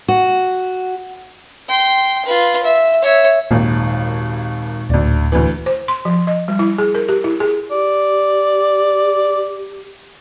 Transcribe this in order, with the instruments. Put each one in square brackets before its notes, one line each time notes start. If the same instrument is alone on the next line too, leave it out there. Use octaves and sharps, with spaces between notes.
[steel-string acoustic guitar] F#4
[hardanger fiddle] G5 C6
F4 B4
E5
C#5 E5
[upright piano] G#1 D#2 [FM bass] A#2
[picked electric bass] D1 [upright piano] D2 D5
[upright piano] D2 E3
[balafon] C5
C6
F3
D#5
G3
E4
G#4
A#4
G4
E4
G#4
[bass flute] G4 [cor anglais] D5